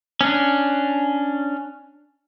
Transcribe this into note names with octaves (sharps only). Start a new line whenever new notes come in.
C#4 D4